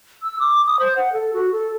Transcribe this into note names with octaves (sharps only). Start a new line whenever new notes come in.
E6
D6
D#6
C5
F#5
A4
F#4
A4